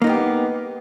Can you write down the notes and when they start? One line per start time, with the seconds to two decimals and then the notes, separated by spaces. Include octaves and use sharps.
0.02 A#3
0.04 D#4
0.07 B3
0.09 G4